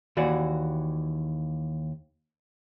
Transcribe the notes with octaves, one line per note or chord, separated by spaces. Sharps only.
D#2 E3 F#4 D5